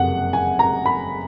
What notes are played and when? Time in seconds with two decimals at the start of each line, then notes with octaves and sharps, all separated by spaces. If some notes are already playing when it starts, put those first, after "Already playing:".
Already playing: F#1 F2 C3 F#5
0.33 G#5
0.59 A#5
0.86 B5